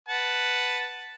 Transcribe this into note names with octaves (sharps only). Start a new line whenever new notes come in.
B4 F#5 A5